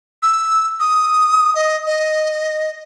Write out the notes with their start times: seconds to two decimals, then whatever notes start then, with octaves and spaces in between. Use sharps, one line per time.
0.23 E6
0.80 D#6
1.55 D#5
1.87 D#5